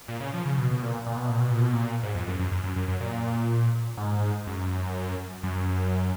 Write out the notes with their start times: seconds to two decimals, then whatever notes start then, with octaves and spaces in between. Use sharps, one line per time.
0.08 A#2
0.20 C#3
0.34 F3
0.46 C#3
0.58 B2
0.71 B2
0.82 A#2
1.06 A#2
1.17 B2
1.29 A#2
1.40 B2
1.51 A#2
1.62 B2
1.73 A#2
2.03 G#2
2.15 F2
2.27 F#2
2.39 F#2
2.52 F#2
2.64 F#2
2.76 F#2
2.88 F#2
3.00 A#2
3.97 G#2
4.47 F#2
5.43 F#2